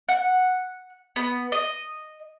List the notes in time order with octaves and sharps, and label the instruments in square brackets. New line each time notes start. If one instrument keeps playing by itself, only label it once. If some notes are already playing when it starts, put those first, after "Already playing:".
[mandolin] F#5
B3
D#5